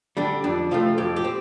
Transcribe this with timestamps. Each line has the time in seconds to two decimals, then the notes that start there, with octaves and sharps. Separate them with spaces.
0.17 D3 G3 D4
0.44 F2 D4
0.71 C3 F3 A3 F4
0.98 F2 G4
1.16 G4
1.24 C4